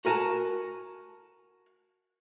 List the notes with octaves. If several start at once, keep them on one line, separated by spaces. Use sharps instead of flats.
F#4 A#4 G#5 A5